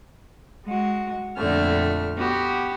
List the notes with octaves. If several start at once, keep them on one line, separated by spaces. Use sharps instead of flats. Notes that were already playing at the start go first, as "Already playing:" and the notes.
G#3 F#4
F2 A#2 D3 A3 F6
B3 F#4 G4